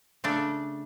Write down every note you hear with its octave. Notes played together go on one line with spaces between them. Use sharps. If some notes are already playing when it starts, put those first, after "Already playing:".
C#3 A3 D4